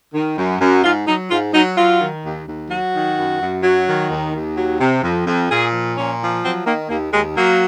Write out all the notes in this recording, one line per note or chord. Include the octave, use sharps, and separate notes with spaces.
D#3
F#2
F#2
G#2 F4
F#3 D#4
G#2 F4
F#3 D#4
F#3 F4
D#3
D#2
D#2
F#3 F#4
D#3
F#2
F#2
F#3
D#3
D#2
D#2
F#3
C3
F2
F2
A#2 G#4
F3
A#2 C#4
F3
F#3 C4
D#3 A#3
D#2 A#3
D#2 G#3
F#3 A#3